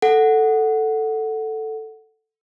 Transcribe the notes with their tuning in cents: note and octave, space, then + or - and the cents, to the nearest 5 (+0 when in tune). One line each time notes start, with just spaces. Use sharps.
A4 +0 F#5 +0